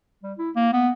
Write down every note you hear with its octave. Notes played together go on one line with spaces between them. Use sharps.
G3
E4
A#3
B3